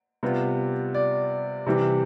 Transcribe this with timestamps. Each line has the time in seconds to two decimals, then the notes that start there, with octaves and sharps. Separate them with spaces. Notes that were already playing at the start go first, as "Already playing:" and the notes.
0.23 C3 G3 B3 F4
0.95 D5
1.66 C3 E3 G3